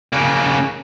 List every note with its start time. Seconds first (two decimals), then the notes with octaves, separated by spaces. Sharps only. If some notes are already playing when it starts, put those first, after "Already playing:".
0.13 C#3 A#3